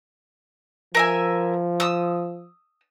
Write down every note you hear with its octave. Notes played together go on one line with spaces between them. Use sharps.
F3 A#4 E5 G#5
D#6 E6